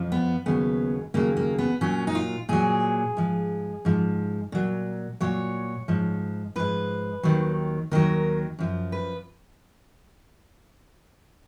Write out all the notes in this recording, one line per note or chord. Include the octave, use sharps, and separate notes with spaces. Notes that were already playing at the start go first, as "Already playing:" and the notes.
Already playing: F2 F3
B3
D#2 C#3 F#3 B3
D#2 C#3 F#3 A#3
A#3
B3
A#2 F#3 C#4
D#4
F4
A#2 F#3 G#4
G#2 F3
G#2 F3
A#2 F#3
A#2 F#3 C#5
G#2 F3
G#2 F3 B4
D#2 D#3 F#3
D#2 D#3 F#3 A#4
F#2 F3
B4